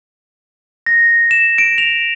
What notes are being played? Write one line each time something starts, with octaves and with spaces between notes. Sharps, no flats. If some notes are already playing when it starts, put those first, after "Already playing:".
A#6
E7
D7
F7